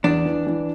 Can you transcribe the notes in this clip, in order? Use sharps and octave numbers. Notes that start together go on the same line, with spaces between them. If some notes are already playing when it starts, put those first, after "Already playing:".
E2 D4
E3
E3